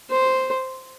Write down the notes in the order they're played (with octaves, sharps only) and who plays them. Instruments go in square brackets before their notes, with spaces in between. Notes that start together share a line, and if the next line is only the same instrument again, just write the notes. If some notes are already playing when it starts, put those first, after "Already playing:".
[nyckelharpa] C5